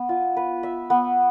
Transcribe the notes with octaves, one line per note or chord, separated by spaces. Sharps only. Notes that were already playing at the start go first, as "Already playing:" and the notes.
Already playing: B3
F4
B4
E5
B3